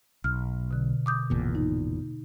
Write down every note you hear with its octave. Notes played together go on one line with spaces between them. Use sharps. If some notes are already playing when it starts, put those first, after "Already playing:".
B1 F6
B2 D3
D6 D#6 G6
G#1 E2 A#2
D#4